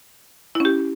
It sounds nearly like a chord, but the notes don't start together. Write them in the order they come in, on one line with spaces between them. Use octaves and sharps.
E4 C#4 G4